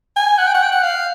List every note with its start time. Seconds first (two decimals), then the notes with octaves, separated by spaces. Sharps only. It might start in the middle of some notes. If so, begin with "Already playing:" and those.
0.16 G#5
0.38 F#5
0.47 G5
0.54 F#5
0.63 G5
0.72 F#5
0.83 F5